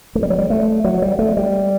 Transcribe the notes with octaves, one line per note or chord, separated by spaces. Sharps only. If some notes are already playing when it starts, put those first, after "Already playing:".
A3
G3
F#3
G3
A3
F#3
G3
A3
G3